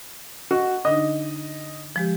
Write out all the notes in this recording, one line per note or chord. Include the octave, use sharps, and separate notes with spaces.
F#4 D#5 F#5
D3 D4 D#4 D#5
F3 G#3 G4